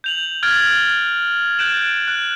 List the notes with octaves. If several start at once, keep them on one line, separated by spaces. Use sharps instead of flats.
G6 F7 F#7
F6 F#6 G#6 A6 D7
F#6 G6 A6 D7 E7 F#7
F#6